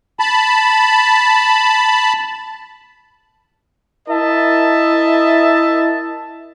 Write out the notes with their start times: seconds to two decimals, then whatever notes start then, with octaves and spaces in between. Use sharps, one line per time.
0.20 A5 B5
4.09 E4 A#4 D#5 E5 A5